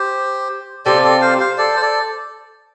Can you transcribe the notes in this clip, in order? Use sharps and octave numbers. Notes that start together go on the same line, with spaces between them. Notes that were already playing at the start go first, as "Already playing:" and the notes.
Already playing: G4 C5
C3 G3 C4 F4 A4 D5
A4 D5
C5 F5
C5 F5
A4 D5
C5
A4 D5